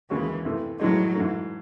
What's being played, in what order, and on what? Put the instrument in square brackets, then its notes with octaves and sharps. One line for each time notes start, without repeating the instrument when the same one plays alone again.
[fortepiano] D#2 C#3 G#3 C#4 F#4 [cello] E3
[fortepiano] C3 E3 A3
[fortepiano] A2 E3 G#3 D#4 [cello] F#3
[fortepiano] G#2 E3 A3